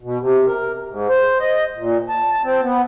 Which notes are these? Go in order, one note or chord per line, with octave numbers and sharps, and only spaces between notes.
B2
C3
A#4
G#2
C5
D#5
A#2
A5
A5
C4
B3